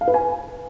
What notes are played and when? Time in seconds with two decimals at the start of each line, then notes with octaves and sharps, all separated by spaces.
0.01 F5
0.08 B4
0.14 G#5